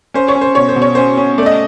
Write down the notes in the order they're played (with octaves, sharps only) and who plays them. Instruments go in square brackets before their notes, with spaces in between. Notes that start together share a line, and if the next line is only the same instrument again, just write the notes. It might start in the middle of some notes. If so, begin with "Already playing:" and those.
[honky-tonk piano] C#4 C5
C#5
C#4
C5
B2 C#5
C5
B2
C#5
C#4 C5
C#4
A3 D5
D#5